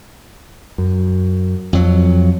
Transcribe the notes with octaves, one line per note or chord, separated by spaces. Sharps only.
F#2
F2 F#3